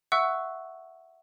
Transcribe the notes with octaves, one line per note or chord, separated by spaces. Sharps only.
E5 F#5 C#6 E6 F#6